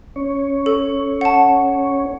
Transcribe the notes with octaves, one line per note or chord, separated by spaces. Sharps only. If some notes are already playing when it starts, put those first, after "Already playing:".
C#4 C#5
A4
F#5 A5